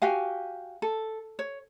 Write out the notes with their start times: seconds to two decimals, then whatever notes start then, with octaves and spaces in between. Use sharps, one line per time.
0.02 F#4 G4 F5 G#5
0.82 A4
1.39 C#5